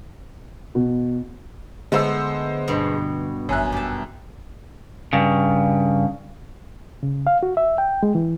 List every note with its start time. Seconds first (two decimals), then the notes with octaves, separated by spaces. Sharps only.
0.75 B2
1.92 D3 G#3 A3 B3 A4 C5 E6
2.68 G2 B2
3.49 G#1 F#2 E5 G#5 F#6
3.72 G4 A5
5.13 G2 C#3
7.03 C#3
7.27 F5
7.43 F#4
7.57 E5
7.78 G5
8.03 G#3
8.15 E3